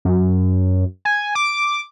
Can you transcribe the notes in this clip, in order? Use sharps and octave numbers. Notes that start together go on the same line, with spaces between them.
F#2
G#5
D6